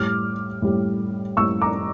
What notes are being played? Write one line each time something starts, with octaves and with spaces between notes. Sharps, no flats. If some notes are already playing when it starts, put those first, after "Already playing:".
Already playing: A2 G3 D6 F6
A2 G3
A2 G3 C#6 E6
A#5 D6